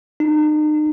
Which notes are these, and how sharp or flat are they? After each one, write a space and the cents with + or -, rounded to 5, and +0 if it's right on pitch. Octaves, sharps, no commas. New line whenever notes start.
D#4 -40